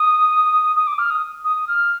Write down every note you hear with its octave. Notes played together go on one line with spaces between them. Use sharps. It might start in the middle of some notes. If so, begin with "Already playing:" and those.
Already playing: D#6
D#6
D6
F6
D#6
D#6
F6